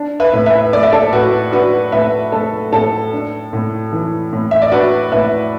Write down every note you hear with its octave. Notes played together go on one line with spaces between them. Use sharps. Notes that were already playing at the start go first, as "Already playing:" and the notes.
Already playing: D4
B4 E5
A2
B4 E5
A3 D5
E5
A4 D5
A2 F#4 B4
D4 F#4 B4
A2 B4 E5
A3 A4
A2 A4
D4
A2
E3
A2
E5
D5
D4 F#4 B4
A2 B4 E5